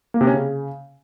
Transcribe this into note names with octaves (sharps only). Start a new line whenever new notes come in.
A#3
C3
C#4
C#3